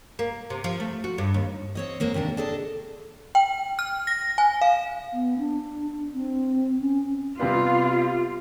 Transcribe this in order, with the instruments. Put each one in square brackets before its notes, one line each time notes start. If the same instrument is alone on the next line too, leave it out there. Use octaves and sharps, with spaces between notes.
[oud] A#3
C3
F3
A3
F#4
G2
D#2
[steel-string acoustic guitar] C4 C#5 D#5
G#2 G#3 A#3 C4
D#2 C3 D4 A#4
D4 G#4 A4 D#5
[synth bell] G5
F6
A#6
G#5
F5
[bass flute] B3
D4
C4
C#4
[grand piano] C3 G3 B3 [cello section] F4